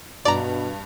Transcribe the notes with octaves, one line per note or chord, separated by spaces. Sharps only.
G2 B2 D5 A#5